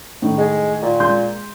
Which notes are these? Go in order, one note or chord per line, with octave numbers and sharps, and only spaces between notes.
A2 D#3
G#3
A#2
G#3 C6 G6